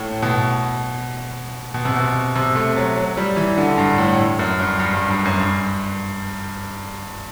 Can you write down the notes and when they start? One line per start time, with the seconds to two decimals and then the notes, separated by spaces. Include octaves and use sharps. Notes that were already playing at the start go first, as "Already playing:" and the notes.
Already playing: A2
0.22 B2
1.74 B2
1.85 C3
1.96 B2
2.35 C3
2.55 A3
2.76 F#3
2.97 F#3
3.17 G3
3.37 E3
3.58 D3
3.78 G2
3.98 A2
4.39 F#2
4.59 G2
4.80 G2
4.94 G2
5.10 G2
5.25 F#2
5.40 G2